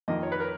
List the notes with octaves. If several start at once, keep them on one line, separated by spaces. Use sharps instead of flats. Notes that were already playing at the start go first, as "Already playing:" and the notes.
F2 D#3 A#3 D#5
C#5
B4
A#4